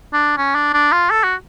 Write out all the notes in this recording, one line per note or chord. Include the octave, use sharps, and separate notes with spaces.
D4
C#4
D4
D4
F4
A4
F#4